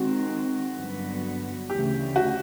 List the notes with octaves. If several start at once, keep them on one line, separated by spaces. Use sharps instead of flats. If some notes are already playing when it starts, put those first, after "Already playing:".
Already playing: D#3 G#3 C4 F#4
G2 D3 F#3 B3
D2 C#3 E3 G4
F#4